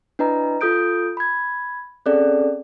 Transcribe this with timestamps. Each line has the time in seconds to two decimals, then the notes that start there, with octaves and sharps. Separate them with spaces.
0.19 D4 E4 B4 D#5 A#5
0.61 F4 A4 D#6 G6 D7
1.17 B5 G#6
2.06 C4 C#4 G#4 A4 D5